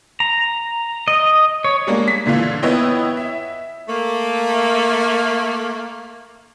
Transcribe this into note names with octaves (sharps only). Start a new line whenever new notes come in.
A#5
D#5
C#5
G3 G#3 A#3 D4
B6
A#2 D3 E3 F4
B3 E4 B4 C#5 D#5 G5
E5
A3 A#3